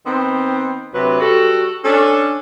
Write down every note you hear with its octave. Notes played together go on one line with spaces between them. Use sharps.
D#3 B3 C4
D2 C3 F#3 B4
G3 F#4 A4
C#4 D4 A4